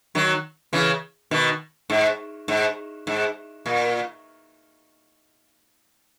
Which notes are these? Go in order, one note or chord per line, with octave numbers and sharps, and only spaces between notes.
D#3 F#3
C#3 E3
B2 D#3
G#2
G#2
G#2
A#2